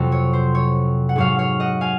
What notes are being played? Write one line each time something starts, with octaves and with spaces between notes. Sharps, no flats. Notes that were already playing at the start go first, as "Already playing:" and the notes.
Already playing: F2 C3 F#3
C#5
C5
C#5
F#5
G#2 F#3 C#5 F5
C#5 F5
D#5 F#5
F5 G#5